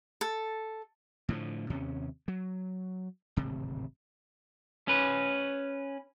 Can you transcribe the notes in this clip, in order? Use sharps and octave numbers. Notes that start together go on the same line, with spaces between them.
A4
A2 D3 E3 F3
D#2 C3 C#4
F#3
D1 G#1 C3
C#4 B4